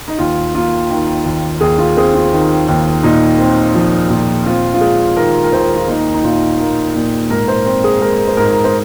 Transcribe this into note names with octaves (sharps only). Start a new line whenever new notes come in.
D#4
D#2 F4
A#3 F4
D#3
D#2
D#2 G#4
F4
C4 G#4
F4
D#3
D#2
A#2 D#4
C4
F3
A#2
C4 F4
F4
G#3 G#4
D#3 A#4
A#4
D#2 C5
F4
A#3 D#4
D#4
A#2 F4
A#3
A#2
G#2 A#4
C5
C4
G#4
G#3 A#4
C5
G#2 A#4
C5